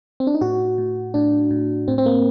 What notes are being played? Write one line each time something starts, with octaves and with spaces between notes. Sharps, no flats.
C4
D4
D#4
A2 F#4
A2
A2 D4
A2
A2 C4
C4
A#3